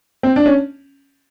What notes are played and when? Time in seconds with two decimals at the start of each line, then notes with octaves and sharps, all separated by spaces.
0.23 C4
0.36 D4
0.46 C#4